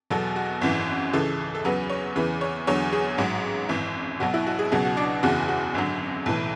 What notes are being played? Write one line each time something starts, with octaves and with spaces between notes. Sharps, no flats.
E2 B2 F#3 A4
F#4
G#1 F#2 E3
C#2 C#3 E3 A4
A4
E2 C#3 F#3 B4
C#5
E2 C#3 E3 B4
C#5
E2 D3 F#3 C#5
G#4
A1 G#2 F#3
G#1 F#2 E3
B1 B2 F#3 F#4
E4
F#4
G#4
C#2 B2 F#3 G#4
F#4
D4
F#1 E2 C#3 E3 F#4
F#4
G#1 F#2 D3 F#3
B1 A2 E3